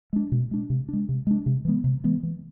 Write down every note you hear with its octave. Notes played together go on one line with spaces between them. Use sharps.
G#3 D4
B2
G#3 D4
C3
G#3 D4
C3
G#3 D4
C3
E3 G#3 B3
C3
E3 G#3 B3
E3